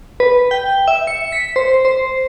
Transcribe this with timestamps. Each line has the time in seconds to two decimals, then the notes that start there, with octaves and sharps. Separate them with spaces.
0.20 B4
0.51 G5
0.88 E5
1.07 C#7
1.32 B6
1.56 C5
1.85 C5